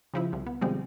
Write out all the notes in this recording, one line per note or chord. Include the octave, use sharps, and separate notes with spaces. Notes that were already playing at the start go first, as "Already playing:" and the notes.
C#3 F3 E4
C2
B3
B2 D3 F3 G3 G#3 C4